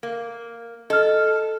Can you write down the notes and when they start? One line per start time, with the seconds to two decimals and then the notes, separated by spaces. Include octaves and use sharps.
0.03 A#3
0.90 A4 D#5 F6